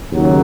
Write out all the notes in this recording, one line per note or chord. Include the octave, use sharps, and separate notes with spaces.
D#2 C#3 F#3